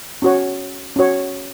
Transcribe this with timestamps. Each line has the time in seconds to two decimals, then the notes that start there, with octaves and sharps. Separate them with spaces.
0.22 C#4 F#4 C#5
0.96 C#4 F#4 C#5